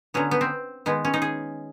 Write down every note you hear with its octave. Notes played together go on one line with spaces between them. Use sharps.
D3 F#3 B3 C#4
B3
C4
D#3 G#3 B3
C#4
D#4
G#4